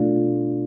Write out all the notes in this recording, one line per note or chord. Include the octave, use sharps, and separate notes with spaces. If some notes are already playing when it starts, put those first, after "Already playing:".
Already playing: B2 A3 D4 F4